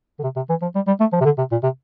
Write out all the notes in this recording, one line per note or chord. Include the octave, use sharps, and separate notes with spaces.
D3
C3
C3
E3
F3
G3
G3
A3
F3
C3
D3
C3
A#2
C3